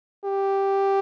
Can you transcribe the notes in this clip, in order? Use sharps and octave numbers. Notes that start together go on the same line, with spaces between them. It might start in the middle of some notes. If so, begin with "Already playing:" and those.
G4